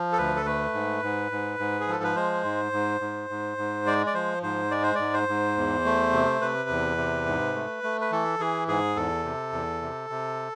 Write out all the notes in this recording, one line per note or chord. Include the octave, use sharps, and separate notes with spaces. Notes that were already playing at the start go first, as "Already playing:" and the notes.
Already playing: F3
A4
D2 B4
A4
A3 B4
G#2
G#2
G#2
G#2
G#4
F3 A4
B4
G#3 C5
G#2
G#2
G#2
G#2
G#2
G#3 D5
D5
F3 C5
G#2 C5
G#3 D5
C5
G#2 D5
C5
G#2
E2
A3
C3
C3 B4
E2
C3
G#2
A3
A3
B4
E3 A4
E3 G#4
G#2 G#4
E2 A4
C3
E2
C3
C3